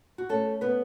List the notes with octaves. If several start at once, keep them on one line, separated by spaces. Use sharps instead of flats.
F#4
A3 C#4 A4
B3 B4